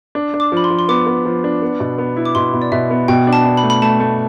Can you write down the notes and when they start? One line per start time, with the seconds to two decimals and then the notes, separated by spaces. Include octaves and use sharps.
0.15 D4
0.34 D4
0.40 D6
0.52 F3 B5
0.64 C6
0.70 F3
0.79 C6
0.88 B3 D6
1.07 B3
1.25 F3
1.44 D4
1.62 B3
1.80 B2
1.98 B3
2.16 E4
2.25 D6
2.35 B2 C6
2.54 B2
2.62 D5
2.72 B2 E5
2.90 B3
3.08 B2 G5
3.27 D4
3.33 A5
3.46 D4
3.57 B5
3.63 A3
3.70 B5
3.82 A3 A5
4.00 A3